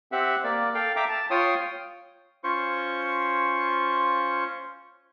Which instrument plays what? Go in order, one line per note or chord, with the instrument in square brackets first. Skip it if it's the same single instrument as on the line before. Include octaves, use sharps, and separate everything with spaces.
[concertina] C4 G4 E5 F#5
A#3 D5
A4 F5 G5
E5 G5 A#5 D6
A5
F4 C#5 G5 C6 D#6
C#4 F4 C5 C#6